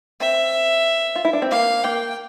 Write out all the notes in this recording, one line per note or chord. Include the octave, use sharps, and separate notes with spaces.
C4 E5
F4
E4
D4
C4
A#3 F5
A#3 G5